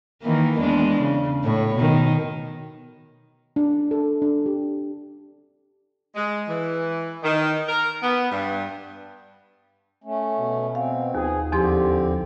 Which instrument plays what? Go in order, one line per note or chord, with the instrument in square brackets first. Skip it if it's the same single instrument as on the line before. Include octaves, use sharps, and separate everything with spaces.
[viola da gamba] D#3 E3 A#3
E2 G#3 D4
C#3
A2 C#5
B2 D#3
[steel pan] D4
A4
D4
G4
[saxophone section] G#3
E3
D#3
A#4
B3
G2
[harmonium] A3 C#4
[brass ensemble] B2
[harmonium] C4 [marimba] F5
[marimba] D#2 [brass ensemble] F3 B3 G#4
[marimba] E2 F3 C6 [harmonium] D3 C4 [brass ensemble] G4